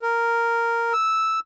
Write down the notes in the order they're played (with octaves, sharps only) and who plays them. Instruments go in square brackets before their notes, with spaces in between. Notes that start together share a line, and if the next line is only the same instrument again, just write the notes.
[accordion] A#4
E6